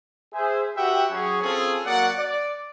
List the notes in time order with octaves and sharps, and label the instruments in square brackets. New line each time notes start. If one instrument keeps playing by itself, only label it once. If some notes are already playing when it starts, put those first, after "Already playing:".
[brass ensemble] G#4 C5 E5
F#4 G4 B4 E5 F#5 G5
F#3 C#4 G#4
C4 C#4 F4 G#4 A4
F#3 A#3 D5 F#5
D5